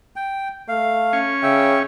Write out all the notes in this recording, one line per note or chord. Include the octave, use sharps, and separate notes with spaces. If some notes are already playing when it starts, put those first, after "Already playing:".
G5
A3 F5
C#4 C#6
C#3 E5 G5